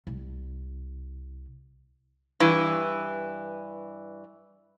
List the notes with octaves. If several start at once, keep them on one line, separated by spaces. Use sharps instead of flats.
C2
G2 E3